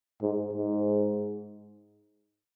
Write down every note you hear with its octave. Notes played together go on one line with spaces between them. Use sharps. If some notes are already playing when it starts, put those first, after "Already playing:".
G#2
G#2